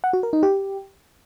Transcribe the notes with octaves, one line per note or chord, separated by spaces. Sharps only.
F#5
F#4
A#4
D#4
G4